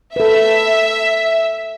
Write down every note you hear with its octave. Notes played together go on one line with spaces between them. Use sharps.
A4 B4 E5